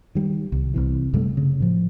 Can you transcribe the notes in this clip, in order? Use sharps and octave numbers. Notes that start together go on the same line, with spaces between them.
D#3 G3
C2
C2 C3 E3
F#2 C3 G3 A3
C#3
A2 F3